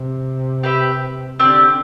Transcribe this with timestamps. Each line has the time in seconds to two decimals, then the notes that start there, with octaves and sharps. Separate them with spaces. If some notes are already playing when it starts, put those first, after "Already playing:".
Already playing: C3
0.63 G4 B4 E5
1.39 D3 C4 G4 D5